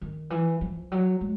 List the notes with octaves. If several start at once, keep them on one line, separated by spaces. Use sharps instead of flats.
D#3
E3
F3
F#3
G#3